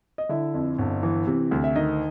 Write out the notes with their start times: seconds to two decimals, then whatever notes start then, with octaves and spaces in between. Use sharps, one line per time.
0.18 D#5
0.29 D3 E4 E5
0.54 F2
0.79 G1
1.03 E3
1.27 C3
1.51 D2
1.64 E5
1.75 D#3 D#4 D#5